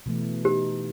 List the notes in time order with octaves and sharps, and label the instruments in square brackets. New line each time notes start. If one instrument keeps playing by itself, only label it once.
[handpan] B2 E3 A3
[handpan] D#4 [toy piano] G4